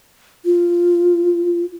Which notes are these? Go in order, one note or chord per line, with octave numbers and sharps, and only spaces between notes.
F4